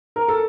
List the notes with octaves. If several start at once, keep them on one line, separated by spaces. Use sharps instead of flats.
A#4
A4